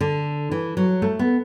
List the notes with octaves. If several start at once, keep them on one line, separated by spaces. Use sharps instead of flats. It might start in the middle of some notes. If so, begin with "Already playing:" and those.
D3
E3
F#3
A3
B3